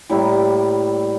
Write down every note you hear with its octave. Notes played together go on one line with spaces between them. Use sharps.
A2 G3 A#3 E4